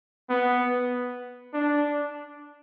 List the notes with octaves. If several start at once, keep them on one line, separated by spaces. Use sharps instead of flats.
B3
D4